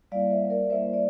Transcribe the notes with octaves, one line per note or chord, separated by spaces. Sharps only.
G3 A#3 E4 D5 F5
C5 E5
A#4 D5
G3 A#3 E4 C5 E5
D5